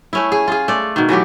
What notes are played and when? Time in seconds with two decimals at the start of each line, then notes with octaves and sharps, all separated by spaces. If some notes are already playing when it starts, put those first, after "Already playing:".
0.13 A3 C#4 E4
0.32 G#4
0.48 F4 G#4
0.68 A3 D5
0.96 B2 D#3
1.09 E3 F#3 A3 G4